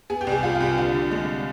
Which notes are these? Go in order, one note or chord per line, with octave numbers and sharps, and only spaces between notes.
B3 G#4
G4
C2
G#4
C2 F4
F4
C2
G4
D3 F4
D3
G#3